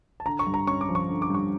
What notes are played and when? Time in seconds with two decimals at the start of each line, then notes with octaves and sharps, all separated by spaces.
0.20 A5
0.25 D3 A#5
0.39 C#6
0.47 G2
0.54 A#5
0.67 C#4 C#6
0.81 D6
0.89 F3
0.95 C#6
1.09 D3
1.22 D6
1.30 G2 C#6